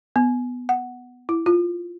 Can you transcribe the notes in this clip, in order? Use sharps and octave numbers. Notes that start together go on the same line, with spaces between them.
B3
F#5
E4
F4